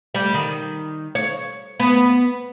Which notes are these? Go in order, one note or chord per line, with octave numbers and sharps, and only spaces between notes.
G3
D#3
C#5
B3